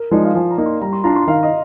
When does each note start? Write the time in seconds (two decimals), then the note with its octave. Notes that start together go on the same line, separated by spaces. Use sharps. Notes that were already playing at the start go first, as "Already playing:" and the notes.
Already playing: A#4
0.11 F3 G#3 D#4 D5
0.24 F5
0.35 F3 G#5
0.51 A#5
0.58 A#3 D#4
0.66 C6
0.81 G3 A#5
0.93 C6
1.04 D4 F4 A#5
1.16 C6
1.27 D#3 F5
1.43 D#5